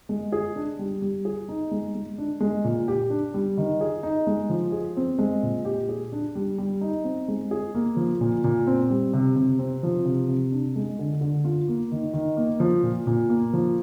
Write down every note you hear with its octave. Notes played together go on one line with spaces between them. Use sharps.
G#3
G#4
D4
G3
G3
G#4
D#4
G#3
G#3
D4
G#3
A#2
G4
D4
G3
D#3
G#4
D#4
G#3
F3
G#4
C4
G#3
A#2
G4
G#4
D4
G3
G3
D#4
C4
G#3
G#4
A#3
F3
A#2
A#2
C4
G3
C3
C3
C4
F3
C3
C3
D4
G#3
D3
D3
F4
A#3
D#3
D#3
A#3
F3
A#2
A#2
A#3
F3